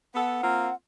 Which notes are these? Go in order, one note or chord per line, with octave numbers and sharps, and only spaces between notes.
B3 A4 F#5
A#3 C4 F4